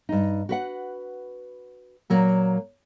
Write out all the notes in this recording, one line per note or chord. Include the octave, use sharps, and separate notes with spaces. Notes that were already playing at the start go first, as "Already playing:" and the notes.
G2 D#4
F#4 B4 F#5
A#2 F#3 A#3